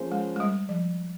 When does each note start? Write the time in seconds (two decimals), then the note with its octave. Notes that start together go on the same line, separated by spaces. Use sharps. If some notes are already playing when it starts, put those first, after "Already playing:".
Already playing: F3 A#3 C#4 G#4 C5
0.12 G#3
0.36 G#3
0.40 G3
0.69 F3